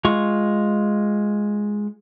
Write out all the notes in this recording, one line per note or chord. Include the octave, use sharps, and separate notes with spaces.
G#3 F4 C#6